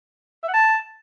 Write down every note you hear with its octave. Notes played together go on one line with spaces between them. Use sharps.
E5
F#5
A5